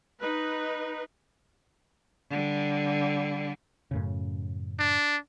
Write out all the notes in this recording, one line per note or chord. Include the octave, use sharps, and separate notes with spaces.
D#4 B4
D3 G3
F#2 A2 C#3
D4